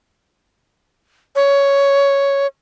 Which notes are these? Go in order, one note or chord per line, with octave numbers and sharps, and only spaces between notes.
C#5